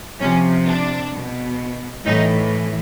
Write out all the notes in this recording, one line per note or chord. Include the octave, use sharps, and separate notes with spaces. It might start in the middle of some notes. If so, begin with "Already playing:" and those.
C3 F3 C#4
D4
B2
A2 E3 D#4